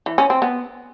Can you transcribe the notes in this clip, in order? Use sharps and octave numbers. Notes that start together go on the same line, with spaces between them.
E3
C#4
C4
B3